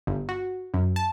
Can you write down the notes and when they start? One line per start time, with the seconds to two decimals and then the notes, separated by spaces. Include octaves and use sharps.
0.07 G1
0.29 F#4
0.74 F#2
0.96 A5